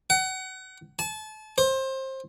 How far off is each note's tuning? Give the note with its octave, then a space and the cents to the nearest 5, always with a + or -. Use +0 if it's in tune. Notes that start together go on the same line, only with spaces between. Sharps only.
F#5 +30
A5 -35
C5 +25